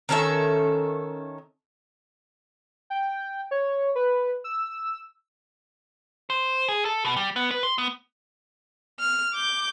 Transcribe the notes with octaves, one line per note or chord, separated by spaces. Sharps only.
D#3 C#4 A4 E5
G5
C#5
B4
E6
C5
G#4
A4
B2
G3
B3
B4
C6
B3
F6
D6 G6